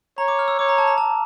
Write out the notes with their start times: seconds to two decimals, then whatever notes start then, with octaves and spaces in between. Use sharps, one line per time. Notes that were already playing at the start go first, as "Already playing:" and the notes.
0.18 C#5 A#5
0.28 D6
0.39 F6
0.48 E6
0.59 C#5 D6
0.69 A#5
0.78 A5
0.88 A#5
0.98 A5